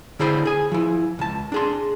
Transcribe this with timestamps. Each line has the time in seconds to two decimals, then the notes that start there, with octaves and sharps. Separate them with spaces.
0.19 D3 E4 G#4 C5 D5 B5
0.45 G#4 G#5
0.72 F3 E4
1.19 C#2 A5
1.52 D4 G#4 C6